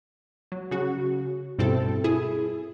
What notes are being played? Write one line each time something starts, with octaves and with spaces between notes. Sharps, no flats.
F#3
C#3 F#4
G2 B2 C4 E4 A4
E4 G#4